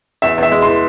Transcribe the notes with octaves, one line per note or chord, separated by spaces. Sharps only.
E2 E5
E2
E5
G#3
E3 C6